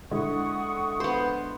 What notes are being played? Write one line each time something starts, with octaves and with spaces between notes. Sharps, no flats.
D3 G#3 E4 F#5 C#6 D#6
B3 C5